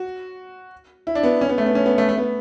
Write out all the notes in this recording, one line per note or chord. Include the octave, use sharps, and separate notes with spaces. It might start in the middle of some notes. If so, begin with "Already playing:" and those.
Already playing: F#4
E4
D4
B3
C#4
B3
A3
B3
C#4
B3
A3
A3
B3